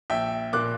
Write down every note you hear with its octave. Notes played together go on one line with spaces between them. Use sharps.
A#1 E5 G5
A#2 A#3 D6 F#6